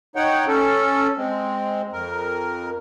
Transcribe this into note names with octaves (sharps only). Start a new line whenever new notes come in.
D#4 C#5 F#5 G5
C#4 A4
G#3 C4
F2 A#4